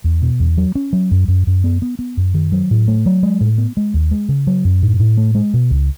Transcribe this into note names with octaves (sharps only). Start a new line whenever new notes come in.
E2
B2
E2
F#3
C#4
F#3
F#2
F#2
F#2
B3
B3
B3
F#2
D#3
F#3
A2
A3
F#3
G#3
A2
B3
G#3
D#2
G#3
C#3
F#3
F#2
A2
A2
A3
G#3
B2
C#2